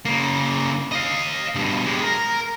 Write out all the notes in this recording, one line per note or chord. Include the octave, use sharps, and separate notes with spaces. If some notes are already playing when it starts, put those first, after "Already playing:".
C#3 A#3
D#5 F5
G2 B2
G#3 G4
A#4